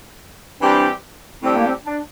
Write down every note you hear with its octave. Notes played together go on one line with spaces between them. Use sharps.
E3 G3 C4 D4 G4
A2 G3 C4 D4 G4
A#3
C4
D4